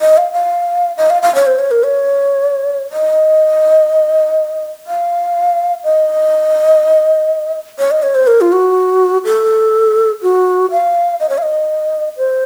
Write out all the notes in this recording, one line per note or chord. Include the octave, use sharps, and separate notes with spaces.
D#5
F5
F5
D#5
F5
F5
C#5
C5
C#5
A#4
C#5
D#5
F5
D#5
C#5
D#5
C#5
C5
A#4
F4
F#4
A4
F#4
F5
D#5
C#5
F5
D#5
C5